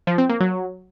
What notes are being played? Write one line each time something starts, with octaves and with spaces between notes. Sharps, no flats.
F3
C4
A#3
F#3